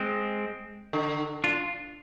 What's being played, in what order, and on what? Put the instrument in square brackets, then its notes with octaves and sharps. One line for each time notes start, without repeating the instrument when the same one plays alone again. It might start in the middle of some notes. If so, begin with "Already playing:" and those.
Already playing: [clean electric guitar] G#3 C4
[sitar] D3
[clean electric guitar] D4 F4